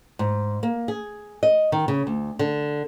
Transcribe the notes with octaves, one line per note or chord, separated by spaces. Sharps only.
G#2
A#3
G#4
D#5
D#3
C#3
D2
D3